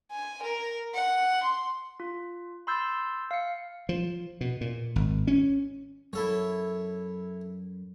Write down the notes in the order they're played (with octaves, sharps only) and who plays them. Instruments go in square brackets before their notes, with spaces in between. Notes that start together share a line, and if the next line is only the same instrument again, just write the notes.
[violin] G#5
A#4
F#5
C6
[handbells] F4
B5 C6 E6 G6 A6
F5 C#7
[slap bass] F3
B2
A#2
G#1
C#4
[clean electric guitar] F#2 [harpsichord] E4 A4 C#5